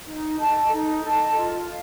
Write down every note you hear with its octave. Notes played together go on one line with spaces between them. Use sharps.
D#4
A4 D#5 A5
D#4
A4 D#5 A5
F4
F5